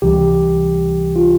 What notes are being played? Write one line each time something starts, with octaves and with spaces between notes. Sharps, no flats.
C#2 C3 E3 G3 G4
F4